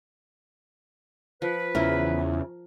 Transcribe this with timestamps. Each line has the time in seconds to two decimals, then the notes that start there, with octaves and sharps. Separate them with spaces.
1.42 F3 B4
1.75 E2 C#3 E4 A#4